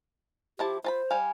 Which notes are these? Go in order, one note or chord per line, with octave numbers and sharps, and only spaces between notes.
F3 E4 G4 A5
F4 C5 A5 B5
G3 F5 G#5